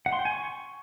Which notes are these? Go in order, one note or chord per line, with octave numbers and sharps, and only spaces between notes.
F#5
C6
G5
G#5
C#6